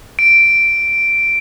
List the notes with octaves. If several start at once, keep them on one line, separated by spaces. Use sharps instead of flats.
D7